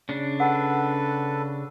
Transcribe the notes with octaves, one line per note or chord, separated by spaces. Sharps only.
C#3 D4
A4 B4 F#5